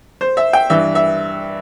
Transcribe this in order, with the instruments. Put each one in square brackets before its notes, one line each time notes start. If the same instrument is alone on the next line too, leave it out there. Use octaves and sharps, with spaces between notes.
[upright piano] C5
E5
G5
G2 E3 E5
E5